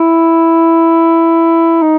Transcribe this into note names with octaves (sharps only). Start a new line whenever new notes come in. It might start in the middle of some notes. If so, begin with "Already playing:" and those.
Already playing: E4
D#4